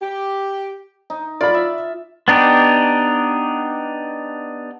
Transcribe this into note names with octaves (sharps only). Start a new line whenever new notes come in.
G4
D#4
F4 D5 B5
E5
B3 D4 D#4 G4